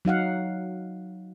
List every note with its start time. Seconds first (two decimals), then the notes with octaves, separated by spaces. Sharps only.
0.05 F#3 D#4 F5 F#5